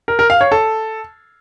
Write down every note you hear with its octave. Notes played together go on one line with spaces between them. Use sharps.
A#4
A#4
F5
C#5
A4